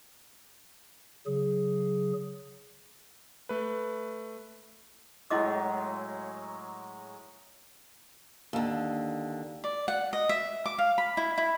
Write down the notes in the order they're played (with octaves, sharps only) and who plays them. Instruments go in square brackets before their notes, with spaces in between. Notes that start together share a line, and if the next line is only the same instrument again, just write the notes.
[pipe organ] C#3 F#3 G#4
[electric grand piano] A3 B4
[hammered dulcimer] A2 F#3 G#3 [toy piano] E4 D#5 D6
[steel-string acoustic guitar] D#2 D3
[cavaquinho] D5
F#5
D#5
E5
D6
F5
B5
E4
E4